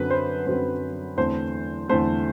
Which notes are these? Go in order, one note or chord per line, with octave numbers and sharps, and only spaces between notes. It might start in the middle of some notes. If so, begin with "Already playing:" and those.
Already playing: F#2 D3 F#3 C4 B4
C5
F#2 D3 F#3 C4 C5
E2 D3 A3 C4 C5
E2 D3 A3 C4 C5